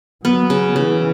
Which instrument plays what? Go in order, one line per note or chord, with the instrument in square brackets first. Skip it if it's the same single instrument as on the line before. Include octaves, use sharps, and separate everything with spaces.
[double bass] F#3 [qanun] B3
[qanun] C#3
[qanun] C#3 [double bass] E3